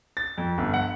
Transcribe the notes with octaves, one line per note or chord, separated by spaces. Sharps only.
A6
F2
G1
F#5